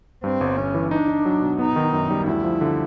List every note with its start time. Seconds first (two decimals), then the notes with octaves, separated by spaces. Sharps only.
0.24 G2 C4
0.41 G1
0.57 G1 C#4
0.75 E3
0.91 D4 D#4
1.08 D#4
1.25 F#3
1.42 B2
1.59 B3 D#4
1.76 D#3
1.93 F#2
2.10 G3
2.27 D2 E4
2.44 F3
2.61 D3